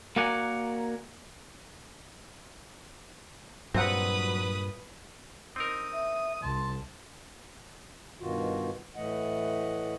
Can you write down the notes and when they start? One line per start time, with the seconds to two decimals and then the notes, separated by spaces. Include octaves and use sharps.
0.16 A#3 F#4 A#4 D5 F#5 G#5
3.74 G2 A#2 F#3 C4 B4 F#5 D#6
5.56 C4 D#4 A#4 D#6
5.93 E5
6.42 C2 A5 C6
8.20 G2 B2 D#3 F4 F#4
8.96 A2 E3 A3 D#5 F#5